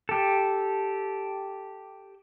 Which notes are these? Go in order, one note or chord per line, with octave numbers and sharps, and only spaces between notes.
G4 A4